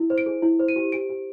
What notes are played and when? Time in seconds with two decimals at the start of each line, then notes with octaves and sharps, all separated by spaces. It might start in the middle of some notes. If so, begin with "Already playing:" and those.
Already playing: E4
0.10 C5
0.18 D7
0.26 G#4
0.42 E4
0.60 C5
0.69 D#7
0.76 G4
0.92 G4 D7
1.09 G4